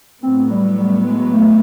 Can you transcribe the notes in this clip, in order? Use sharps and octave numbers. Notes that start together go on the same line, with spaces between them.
A2 F#3 B3 C4
G3
G3
G#3
A3